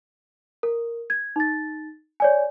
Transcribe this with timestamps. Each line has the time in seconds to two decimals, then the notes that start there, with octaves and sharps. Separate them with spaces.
0.63 A#4
1.10 G#6
1.36 D#4 A6
2.20 C#5 D5 G#5